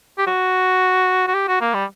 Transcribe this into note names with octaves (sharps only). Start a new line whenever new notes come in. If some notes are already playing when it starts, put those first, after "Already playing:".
G4
F#4
F#4
G4
F#4
A#3
G3